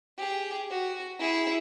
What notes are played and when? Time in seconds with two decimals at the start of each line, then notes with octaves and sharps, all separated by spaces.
0.17 G4 G#4
0.70 F#4
1.19 E4 G#4